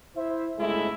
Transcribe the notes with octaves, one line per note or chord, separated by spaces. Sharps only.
E4 C5 E5
G1 D2 C#3 G#3 A3 E4